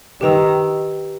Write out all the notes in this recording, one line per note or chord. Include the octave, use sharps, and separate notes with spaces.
D#3 G4 B4 G5 A#5 E6